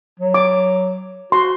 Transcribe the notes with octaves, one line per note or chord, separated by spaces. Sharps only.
F#3
D6
F#4 C6